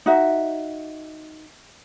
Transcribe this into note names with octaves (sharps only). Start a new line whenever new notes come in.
D#4 F#4 E5